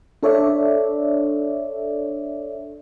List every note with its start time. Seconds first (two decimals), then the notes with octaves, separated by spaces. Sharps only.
0.23 D4 A4 C#5 D5 E5